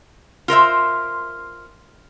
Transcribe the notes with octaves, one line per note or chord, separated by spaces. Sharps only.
F4 A#4 C5 E5